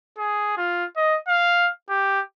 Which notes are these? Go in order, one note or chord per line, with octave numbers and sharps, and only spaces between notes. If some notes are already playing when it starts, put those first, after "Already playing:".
G#4
F4
D#5
F5
G4